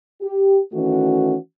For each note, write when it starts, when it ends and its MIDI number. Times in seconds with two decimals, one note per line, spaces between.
0.21 0.58 67
0.72 1.36 51
0.72 1.36 52
0.72 1.36 57
0.72 1.36 61
0.72 1.36 66